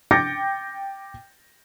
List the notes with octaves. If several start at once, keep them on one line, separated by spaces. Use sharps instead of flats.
G5 D6 G6 A6 A#6 C#7